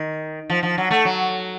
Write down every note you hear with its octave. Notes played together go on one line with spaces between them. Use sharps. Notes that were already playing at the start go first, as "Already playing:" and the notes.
Already playing: D#3
F3
F3
F#3
A3
F#3